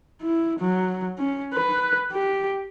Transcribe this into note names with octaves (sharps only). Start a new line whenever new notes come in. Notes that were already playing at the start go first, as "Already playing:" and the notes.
E4
F#3
C#4
B4
G4